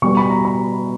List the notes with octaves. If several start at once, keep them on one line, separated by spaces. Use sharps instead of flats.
B2 G3 B3 C#6
B5
A#5
B5